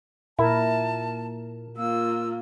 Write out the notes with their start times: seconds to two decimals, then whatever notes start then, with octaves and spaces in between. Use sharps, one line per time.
0.39 A#2 E4 A#4 A5
1.77 A#3 F4 E6